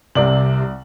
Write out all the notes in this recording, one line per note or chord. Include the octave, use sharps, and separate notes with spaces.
C2 C3 D5 F#7